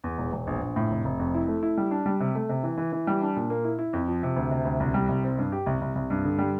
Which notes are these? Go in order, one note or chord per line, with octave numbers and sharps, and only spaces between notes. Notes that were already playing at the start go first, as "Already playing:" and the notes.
E2
E1
E1
A#1
A#1
A2
F1
F1
F2
E4
A3
E4
G3
D4
G3
C3
A3
C3
E3
E3
E3
G3
D4
A#2
A#3
E4
E4
F2
F3
C3
D2
C3
D2
C2
G3
C2
C4
G2
G4
C2
C2
C2
G2
D3
G3